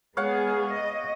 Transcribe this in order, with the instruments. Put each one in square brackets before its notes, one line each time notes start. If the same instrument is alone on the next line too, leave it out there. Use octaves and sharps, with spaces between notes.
[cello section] G#3 B3 G#4 [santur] C#5 F5 F#5
[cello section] D#5